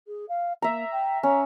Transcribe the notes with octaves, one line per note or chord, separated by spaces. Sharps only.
G#4
F5
A#3 E5 A#5
G5
C#4 A#5